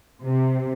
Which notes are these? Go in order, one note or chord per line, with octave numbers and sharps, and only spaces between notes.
C3